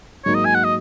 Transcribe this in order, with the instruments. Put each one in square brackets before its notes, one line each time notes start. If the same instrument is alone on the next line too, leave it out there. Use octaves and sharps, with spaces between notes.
[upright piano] G#2 F#3 A#3 D#4 [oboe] C#5
[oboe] D#5
G#5
F#5
D#5